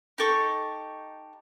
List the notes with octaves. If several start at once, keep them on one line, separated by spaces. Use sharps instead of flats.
D#4 G4 A4 C#6